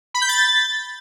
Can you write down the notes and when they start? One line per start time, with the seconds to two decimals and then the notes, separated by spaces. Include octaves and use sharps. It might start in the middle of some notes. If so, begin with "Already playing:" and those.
0.14 B5
0.21 G6
0.29 A6